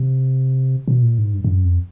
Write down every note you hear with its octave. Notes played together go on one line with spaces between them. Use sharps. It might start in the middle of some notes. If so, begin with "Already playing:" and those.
Already playing: C3
B2
A#2
G#2
G2
G2
F#2
F2